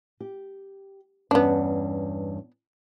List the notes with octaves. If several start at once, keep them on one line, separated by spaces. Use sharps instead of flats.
G4
E2 G2 B3 C#4 D4